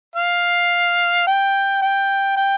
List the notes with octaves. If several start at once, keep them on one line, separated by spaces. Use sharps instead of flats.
F5
G5
G5
G5